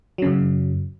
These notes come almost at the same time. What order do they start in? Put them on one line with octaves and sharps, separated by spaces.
F#3 C#3 F#2